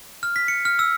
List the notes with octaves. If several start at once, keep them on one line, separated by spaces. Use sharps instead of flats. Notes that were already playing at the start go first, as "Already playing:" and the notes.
F6
B6
C#7
F6
E6